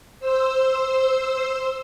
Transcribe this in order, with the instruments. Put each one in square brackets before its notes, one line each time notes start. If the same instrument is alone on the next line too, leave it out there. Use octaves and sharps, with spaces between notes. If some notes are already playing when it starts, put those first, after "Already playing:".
[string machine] C5 E6